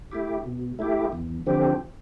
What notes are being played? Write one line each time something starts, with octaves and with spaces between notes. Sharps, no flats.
A3 E4 G4
B2
A3 E4 G4
E2
D3 F3 C4 G4